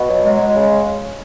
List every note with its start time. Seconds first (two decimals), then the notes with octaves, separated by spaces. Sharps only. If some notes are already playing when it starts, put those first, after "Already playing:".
Already playing: B2
0.09 F#3
0.24 G#3
0.40 G#3
0.55 C#3